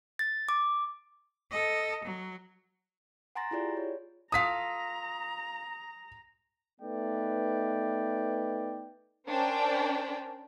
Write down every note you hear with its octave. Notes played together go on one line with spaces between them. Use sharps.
A6
D6
A4 D#5
F#3
F#5 G#5 A#5 C6 A6 A#6
E4 F4 G4 G#4 D5
C#5
F4 A4 A#5 D#6 B6
A3 B3 D#4 B4 D5 G5
C#4 D4 A#4 C5 D5 G5